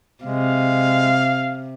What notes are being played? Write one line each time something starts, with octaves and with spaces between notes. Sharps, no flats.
C3 G#3 F5